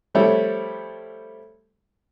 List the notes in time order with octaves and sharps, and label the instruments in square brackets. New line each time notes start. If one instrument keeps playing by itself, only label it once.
[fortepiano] F3 G3 A3 C4 E4 C#5